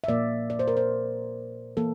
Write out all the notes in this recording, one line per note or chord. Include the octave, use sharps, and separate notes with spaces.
E5
A#2 F3 A#3 D5
D5
C5
A#4
C5
E3 A#3 A4